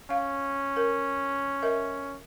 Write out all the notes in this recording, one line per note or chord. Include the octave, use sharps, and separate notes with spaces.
C#4 F5
A#4
A#4 D#5 E5